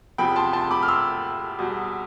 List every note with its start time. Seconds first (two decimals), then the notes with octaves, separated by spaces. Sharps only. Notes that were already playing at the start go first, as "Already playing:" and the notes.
0.18 E2 C3 F3 G5 B5
0.36 A5 C6
0.53 A5 C6
0.71 B5 D6
0.83 F6
0.88 C6 E6
1.58 E2 B2 G3